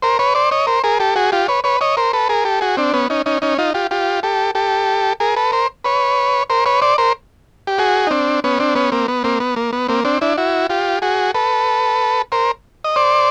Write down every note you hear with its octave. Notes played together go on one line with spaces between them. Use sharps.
A#4 C5
B4 C#5
C5 D5
C#5 D#5
A#4 C5
G#4 A#4
G4 A4
F#4 G#4
F4 G4
B4 C#5
B4 C#5
C#5 D#5
A#4 C5
A4 B4
G#4 A#4
G4 A4
F#4 G#4
C4 D4
B3 C#4
C#4 D#4
C#4 D#4
C#4 D#4
D#4 F4
F4 G4
F4 G4
G4 A4
G4 A4
G#4 A#4
A4 B4
A#4 C5
B4 C#5
A#4 C5
B4 C#5
C5 D5
A#4 C5
G4
F#4 G#4
D#4
C4 D4
B3 C#4
C4 D4
B3 C#4
A#3 C4
B3
A#3 C4
B3
A#3
B3
A#3 C4
C4 D4
D4 E4
E4 F#4
F4 G4
F#4 G#4
A4 B4
A#4 C5
D#5
C5 D5